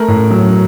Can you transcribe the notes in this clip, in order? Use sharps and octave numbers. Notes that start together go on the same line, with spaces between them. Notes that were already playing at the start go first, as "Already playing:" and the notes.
Already playing: A3 A#4
A2
F#3